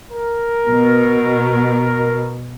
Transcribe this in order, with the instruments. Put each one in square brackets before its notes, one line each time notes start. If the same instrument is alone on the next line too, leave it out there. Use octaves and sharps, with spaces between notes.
[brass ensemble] A#4
[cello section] B2